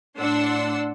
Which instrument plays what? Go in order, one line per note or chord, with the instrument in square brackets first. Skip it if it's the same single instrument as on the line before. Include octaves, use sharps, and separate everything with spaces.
[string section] A2 D4 F#5 C6 E6